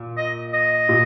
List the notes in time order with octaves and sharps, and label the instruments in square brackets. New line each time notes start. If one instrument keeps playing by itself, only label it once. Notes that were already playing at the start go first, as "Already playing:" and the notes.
Already playing: [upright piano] A#2
[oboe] D#5
D#5
[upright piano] A#2